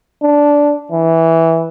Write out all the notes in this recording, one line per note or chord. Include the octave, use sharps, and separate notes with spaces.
D4
E3